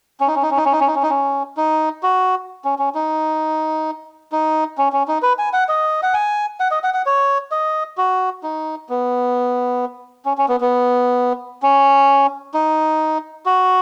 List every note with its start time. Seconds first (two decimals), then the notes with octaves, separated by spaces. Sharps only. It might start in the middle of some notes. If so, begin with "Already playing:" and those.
0.20 C#4
0.27 D#4
0.35 C#4
0.42 D#4
0.51 C#4
0.57 D#4
0.65 C#4
0.72 D#4
0.80 C#4
0.87 D#4
0.95 C#4
1.03 D#4
1.10 C#4
1.57 D#4
2.03 F#4
2.65 C#4
2.79 C#4
2.95 D#4
4.32 D#4
4.78 C#4
4.93 C#4
5.08 D#4
5.22 B4
5.39 G#5
5.53 F#5
5.69 D#5
6.03 F#5
6.14 G#5
6.60 F#5
6.71 D#5
6.84 F#5
6.94 F#5
7.06 C#5
7.51 D#5
7.97 F#4
8.43 D#4
8.89 B3
10.25 C#4
10.38 C#4
10.48 B3
10.61 B3
11.63 C#4
12.54 D#4
13.46 F#4